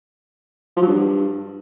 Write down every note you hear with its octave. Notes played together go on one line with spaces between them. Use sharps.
F3
F#3
G2